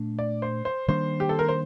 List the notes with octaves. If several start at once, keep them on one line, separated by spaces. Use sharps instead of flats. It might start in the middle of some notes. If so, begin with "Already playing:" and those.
Already playing: A#2 A3 D4
D5
C5
C5
D#3 G3 A#3 D4 C5
G4
A4
A#4
C5